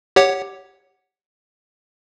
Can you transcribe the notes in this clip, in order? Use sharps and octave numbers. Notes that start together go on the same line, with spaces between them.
G4 C#5 F#5